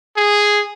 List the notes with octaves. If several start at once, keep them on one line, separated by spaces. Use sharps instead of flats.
G#4